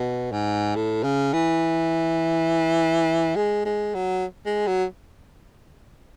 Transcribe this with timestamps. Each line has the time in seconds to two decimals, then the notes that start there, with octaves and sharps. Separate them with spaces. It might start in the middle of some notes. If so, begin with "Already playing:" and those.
Already playing: B2
0.32 G#2
0.76 A2
1.04 C#3
1.33 E3
3.36 G#3
3.65 G#3
3.94 F#3
4.46 G#3
4.67 F#3